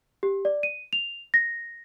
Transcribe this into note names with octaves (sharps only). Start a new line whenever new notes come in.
G4
D5
D#7
F7
A#6